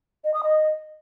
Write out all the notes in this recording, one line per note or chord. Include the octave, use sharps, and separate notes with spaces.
D#5
D#6
D#5